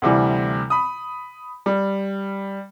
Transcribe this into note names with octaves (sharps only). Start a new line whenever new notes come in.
D2 C3 E3 G3
B5 D#6
G3